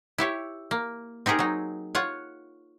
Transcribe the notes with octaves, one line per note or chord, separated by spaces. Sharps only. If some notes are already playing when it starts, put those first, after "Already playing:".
E4 G4 C#5
A#3
C4 D#4 G4 G#4 A#4
F#3 D#4
F4 C#5 F#5